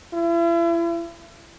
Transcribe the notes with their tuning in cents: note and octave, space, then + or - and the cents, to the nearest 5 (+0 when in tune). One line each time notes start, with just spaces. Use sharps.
E4 +40